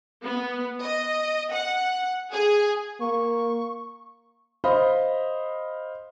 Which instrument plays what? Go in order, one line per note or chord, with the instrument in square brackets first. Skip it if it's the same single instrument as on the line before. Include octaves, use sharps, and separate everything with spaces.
[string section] B3
D#5
F#5
G#4
[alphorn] A#3 [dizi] C#6
[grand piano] C5 D#5 F5 B5